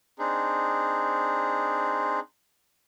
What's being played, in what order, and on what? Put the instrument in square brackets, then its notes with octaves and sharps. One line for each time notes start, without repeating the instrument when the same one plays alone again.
[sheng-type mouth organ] C4 D4 D#4 G#4